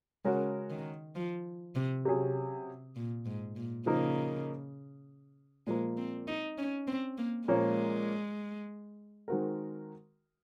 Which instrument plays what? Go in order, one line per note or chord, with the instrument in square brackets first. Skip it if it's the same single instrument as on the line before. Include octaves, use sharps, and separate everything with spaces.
[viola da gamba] C#3 [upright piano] G#3 C#4 F#4 A#4
[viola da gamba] D#3
F3
C3
[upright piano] C3 F#3 C#4 G#4
[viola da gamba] A#2
G#2
A#2
[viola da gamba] C#3 [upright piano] F3 A#3 D#4 A#4
[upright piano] A#2 F3 A#3 [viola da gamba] G#3
[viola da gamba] C4
D#4
C#4
C4
A#3
[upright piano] A#2 F3 A#3 C#4 [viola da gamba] G#3
[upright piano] D#3 G#3 C4 F#4 A#4